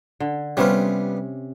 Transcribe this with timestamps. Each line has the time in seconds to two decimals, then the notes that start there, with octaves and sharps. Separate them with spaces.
0.20 D3
0.57 C3 G3 B3 C#4 F4